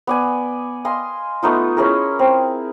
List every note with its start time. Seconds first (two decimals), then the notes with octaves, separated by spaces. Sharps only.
0.07 B3 D5 G#5
0.85 D#5 F5 G#5 C6
1.43 A3 B3 D#4 F4
1.77 C#4 E4 G#4 A#4
2.19 C4